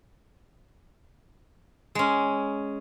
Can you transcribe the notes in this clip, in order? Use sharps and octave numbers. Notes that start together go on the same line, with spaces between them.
G#3 C#4